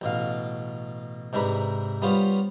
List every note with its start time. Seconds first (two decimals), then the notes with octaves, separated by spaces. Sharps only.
0.01 A1 B2 F5
1.33 G#2 C3 D4 B4 A#5
2.02 G3 B3 C#4 F4 C5